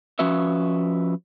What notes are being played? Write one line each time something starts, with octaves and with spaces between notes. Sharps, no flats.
F3 C#4 F#4 B4 E5